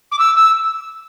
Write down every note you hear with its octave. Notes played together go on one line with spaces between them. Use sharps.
D6
E6
E6